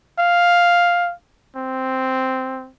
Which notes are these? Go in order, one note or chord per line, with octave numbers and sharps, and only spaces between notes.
F5
C4